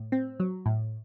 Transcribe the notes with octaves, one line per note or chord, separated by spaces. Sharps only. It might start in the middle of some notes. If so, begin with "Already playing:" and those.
Already playing: A2
C4
F#3
A2